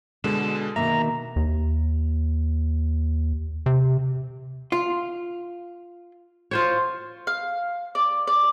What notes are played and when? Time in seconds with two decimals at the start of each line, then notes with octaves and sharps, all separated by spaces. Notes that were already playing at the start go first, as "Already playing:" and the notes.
0.24 B2 D3 G#3 A4 E6
0.76 B2 D#3 A#3 E5 A#5
1.36 D#2
3.66 C3
4.72 F4
6.51 F4 C5 C#5
7.27 F5
7.95 D5
8.27 D5